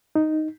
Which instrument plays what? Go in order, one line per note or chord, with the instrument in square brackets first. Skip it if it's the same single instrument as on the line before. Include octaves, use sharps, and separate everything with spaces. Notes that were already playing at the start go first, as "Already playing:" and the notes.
[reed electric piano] D#4